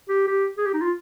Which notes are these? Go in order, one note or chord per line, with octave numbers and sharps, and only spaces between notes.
G4
G4
G#4
G4
D#4
F4